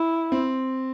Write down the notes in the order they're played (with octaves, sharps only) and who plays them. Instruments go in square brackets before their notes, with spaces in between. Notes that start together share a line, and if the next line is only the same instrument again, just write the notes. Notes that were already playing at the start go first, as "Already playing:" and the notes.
Already playing: [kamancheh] E4
[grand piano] C4